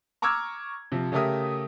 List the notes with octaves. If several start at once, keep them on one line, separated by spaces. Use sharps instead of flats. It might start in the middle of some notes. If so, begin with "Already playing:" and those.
A#5 C#6 D6 E6 F6 G#6
C3 F3
C#3 A3 G4 A#4 E5 D#6